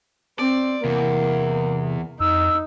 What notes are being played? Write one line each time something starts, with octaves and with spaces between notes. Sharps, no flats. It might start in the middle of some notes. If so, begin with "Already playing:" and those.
C4 D5
E2 C3 A#3
F2 D#4 E6